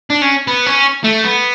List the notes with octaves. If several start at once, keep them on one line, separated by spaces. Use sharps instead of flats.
D4
C#4
B3
C#4
A3
B3